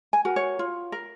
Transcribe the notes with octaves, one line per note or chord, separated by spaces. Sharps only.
G#5
F#4 A#4
C#5
F4
A#4